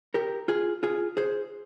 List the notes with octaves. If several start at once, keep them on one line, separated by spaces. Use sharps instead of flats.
G4 A#4
F4 G#4
F4 G#4
G#4 C5